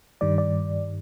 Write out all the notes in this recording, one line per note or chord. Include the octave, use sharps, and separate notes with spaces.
G2 D#3 G3 D5
D5